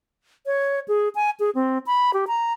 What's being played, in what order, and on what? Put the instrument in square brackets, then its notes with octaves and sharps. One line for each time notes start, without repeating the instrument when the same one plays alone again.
[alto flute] C#5
G#4
G#5
G#4
C4
B5
G4
A#5